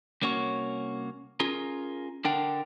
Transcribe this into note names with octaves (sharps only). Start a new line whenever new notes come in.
C2 A#3 C#4 F#4 C#5
C#4 F4 G#4 A#4
D3 D4 A#4 F#5 G5